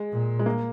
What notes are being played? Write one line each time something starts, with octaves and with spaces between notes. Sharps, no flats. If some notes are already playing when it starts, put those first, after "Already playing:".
Already playing: G#3
A#2
G#3
A#3